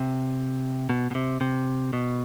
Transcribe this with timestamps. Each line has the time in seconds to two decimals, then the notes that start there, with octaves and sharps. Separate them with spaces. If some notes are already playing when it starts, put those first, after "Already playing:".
Already playing: C3
0.89 B2
1.11 B2
1.15 C3
1.41 C3
1.93 B2